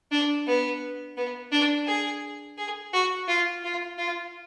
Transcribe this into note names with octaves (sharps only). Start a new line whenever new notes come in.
D4
B3
B3
D4
G#4
G#4
F#4
F4
F4
F4